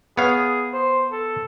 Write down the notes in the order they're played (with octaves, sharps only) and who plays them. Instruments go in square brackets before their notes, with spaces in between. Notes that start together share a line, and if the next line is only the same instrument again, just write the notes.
[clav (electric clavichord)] B3 C#5 F5 [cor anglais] G#4
[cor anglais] C5
A4